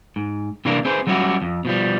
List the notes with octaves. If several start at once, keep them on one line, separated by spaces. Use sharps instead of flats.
G#2
C3 E3 G3 A#3 D4 A#4
C4 G#4 B4 C5
F#3 G3 C#4 E4 F#4 G4
F2
B2 F3 G3